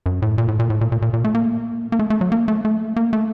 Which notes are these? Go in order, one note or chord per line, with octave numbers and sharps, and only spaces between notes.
F#2
A2
A#2
A2
A#2
A2
A#2
A#2
A#2
A#2
A3
A#3
A#3
A3
A3
F#3
A#3
A3
A3
A#3
A3